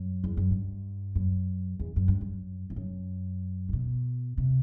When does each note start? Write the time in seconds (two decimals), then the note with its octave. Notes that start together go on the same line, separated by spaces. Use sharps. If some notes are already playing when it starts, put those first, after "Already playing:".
Already playing: F#2
0.24 E2
0.37 F#2
0.51 G2
1.15 F#2
1.79 E2
1.96 F#2
2.08 G2
2.21 F#2
2.70 E2
2.76 F#2
3.69 C3
3.73 B2
4.38 C3